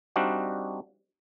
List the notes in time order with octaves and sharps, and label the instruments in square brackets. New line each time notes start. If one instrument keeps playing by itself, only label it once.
[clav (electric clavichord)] G3 C4 D4 D#4 F#4 F5